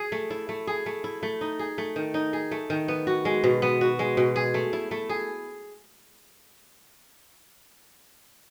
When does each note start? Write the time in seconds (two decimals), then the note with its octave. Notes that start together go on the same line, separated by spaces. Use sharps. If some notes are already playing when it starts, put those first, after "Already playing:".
Already playing: G#4
0.12 A3
0.30 E4
0.49 A3
0.67 G#4
0.86 A3
1.04 E4
1.23 A3
1.41 D#4
1.59 G#4
1.78 A3
1.96 D#3
2.14 D#4
2.33 G#4
2.51 A3
2.70 D#3
2.88 B3
3.07 F#4
3.25 G#3
3.44 B2
3.62 B3
3.81 F#4
3.99 G#3
4.17 B2
4.36 G#4
4.54 A3
4.73 E4
4.91 A3
5.09 G#4